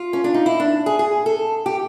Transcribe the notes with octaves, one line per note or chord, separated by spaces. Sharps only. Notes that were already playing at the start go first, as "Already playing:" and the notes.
Already playing: F4
C#4
D4
D#4
E4
D4
G#4
G#4
A4
G4